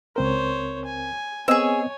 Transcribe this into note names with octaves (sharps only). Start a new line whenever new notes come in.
C#2 C4 A#4 C5 C#5
G#5
B3 C4 G#4 C#5 D#5 G#5 E6